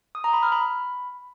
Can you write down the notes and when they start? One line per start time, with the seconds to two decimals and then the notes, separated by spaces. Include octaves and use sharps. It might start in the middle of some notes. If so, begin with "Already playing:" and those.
0.15 D#6
0.24 A#5
0.33 B5
0.43 F6
0.52 B5